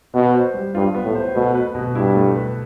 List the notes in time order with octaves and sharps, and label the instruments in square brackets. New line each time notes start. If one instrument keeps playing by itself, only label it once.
[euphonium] B2 [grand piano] B3
[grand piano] C5
G3
[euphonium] G2 [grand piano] F4
[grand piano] B3
[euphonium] A2
[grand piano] C5
[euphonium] B2 [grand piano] A3
[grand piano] B4
B2
[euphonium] G2 [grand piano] E4
[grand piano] A3
B4